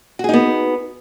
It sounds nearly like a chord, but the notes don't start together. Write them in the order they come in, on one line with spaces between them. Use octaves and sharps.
F#4 G#4 D#4 B3